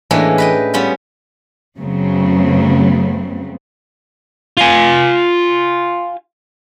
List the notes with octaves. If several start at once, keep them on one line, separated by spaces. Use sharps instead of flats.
A2 E3 G#3 A#3 C#4 D4
B4 D#5 G5
G3 B3 C#4 F4
F#2 C#3 F#3 A3 B3 C4
F4 G#5